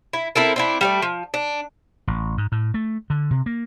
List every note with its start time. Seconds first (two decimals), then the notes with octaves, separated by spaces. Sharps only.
0.13 E4
0.35 C4 E4 A4 A#4
0.56 C4 D4 E4
0.81 G3 A3 D5
1.02 F3
1.34 D4
2.07 A1
2.38 G#2
2.52 A2
2.74 A3
3.10 D3
3.31 C3
3.46 A#3